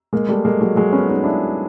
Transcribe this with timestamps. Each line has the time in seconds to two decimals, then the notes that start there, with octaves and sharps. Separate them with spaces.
0.13 G#3 A#3
0.29 G3 A3
0.45 G#3 A#3
0.61 F#3 G#3
0.76 F#3 G#3
0.93 B3 C#4
1.08 C#4 D#4
1.24 D4 E4